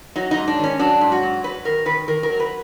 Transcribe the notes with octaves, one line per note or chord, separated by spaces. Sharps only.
F#3 D#4
D#4
G#2
D4
D#3 C#4
F#3 D4
G#2
F#4
F#3
F#3 B4
D#3 A#4
D#3 B4
D#3 A#4
A#4
F#3
B4